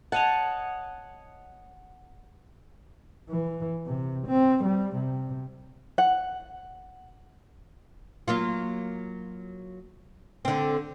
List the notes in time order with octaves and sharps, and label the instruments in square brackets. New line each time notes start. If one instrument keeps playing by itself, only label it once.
[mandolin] C#5 D#5 A5 [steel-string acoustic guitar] F#5
[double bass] E3
C3
C4
G3
C3
[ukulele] F#5
[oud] F#3 A#3 F4
D3 C4